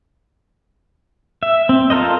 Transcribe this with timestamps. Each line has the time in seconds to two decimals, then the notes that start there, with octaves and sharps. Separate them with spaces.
1.43 E5
1.69 C4
1.90 F4 A4 A#4 C5 D#5